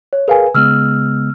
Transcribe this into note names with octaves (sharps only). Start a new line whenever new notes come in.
C#5
G#4 A#4 B4 F5 G#5
C#3 G#3 B3 E6 F6